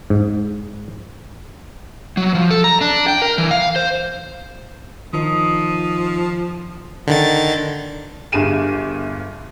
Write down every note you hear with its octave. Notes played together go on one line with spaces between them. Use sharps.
G#2
F#3
F3
A4
A#5
D4
G5
A#4
E3
F5
C5
D#3 F3 D#4 D#6
D3 D#3 A6
G1 G2 G#4 D#7 E7